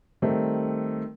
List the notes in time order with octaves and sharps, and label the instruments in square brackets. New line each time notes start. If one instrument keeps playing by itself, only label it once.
[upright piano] D#3 G3 A3 C4